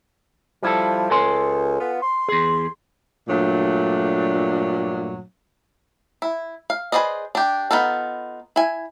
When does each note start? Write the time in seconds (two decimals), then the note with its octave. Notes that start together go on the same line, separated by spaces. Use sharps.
0.63 F3 G3 E4 A4
1.11 C#2 A4 G#5 C6
1.80 B3 F4
2.02 C6
2.28 E2 G#4
3.28 G2 A#2 F#3 A3 D4
6.22 E4
6.70 F5
6.92 G#4 B4 C5 D5 D#5
7.35 D4 G4
7.71 B3 D#4 F4 A4
8.56 E4 G#5